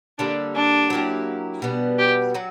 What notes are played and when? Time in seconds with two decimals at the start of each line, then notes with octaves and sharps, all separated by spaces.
0.18 D3 G3 A#3 D4
0.55 D4
0.90 F#3 A#3 E4 G4
1.62 B2 G3 B3
1.99 G4
2.34 F#3 F#4